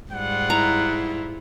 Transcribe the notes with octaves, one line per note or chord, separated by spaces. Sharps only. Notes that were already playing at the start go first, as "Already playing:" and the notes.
G#2 G3 F4 F#5
E4 A#5